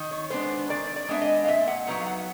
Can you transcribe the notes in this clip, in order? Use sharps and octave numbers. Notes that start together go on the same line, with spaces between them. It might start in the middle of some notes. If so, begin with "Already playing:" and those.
Already playing: D#3
C#5
G#3 B3 D4 C5
D#3 D5
D5
G#3 B3 D4 E5
D#5
F5
A#2 E5
F#5
F#3 B3 D#4 F#5
F5
F#5